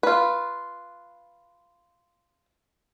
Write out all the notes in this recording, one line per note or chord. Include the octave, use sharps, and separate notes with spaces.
F4 B4